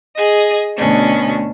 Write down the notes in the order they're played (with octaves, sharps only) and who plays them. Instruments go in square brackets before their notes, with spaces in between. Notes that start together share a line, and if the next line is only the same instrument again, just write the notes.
[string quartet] G#4 D#5
D2 B2 C#4 D4